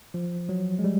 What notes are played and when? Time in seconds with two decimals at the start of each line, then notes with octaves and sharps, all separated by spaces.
0.14 F3
0.49 F#3
0.79 G#3
0.84 G3